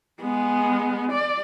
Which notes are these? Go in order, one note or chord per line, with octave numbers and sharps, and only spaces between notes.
G#3 B3
D5